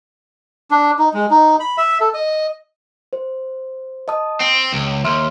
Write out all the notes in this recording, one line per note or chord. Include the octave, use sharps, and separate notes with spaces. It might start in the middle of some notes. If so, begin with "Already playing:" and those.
D4
D#4
G#3
D#4
B5
E5
A4
D#5
C5
D#5 A5 D#6
C4 G5 C7
C#2
D#2 E5 C6 F6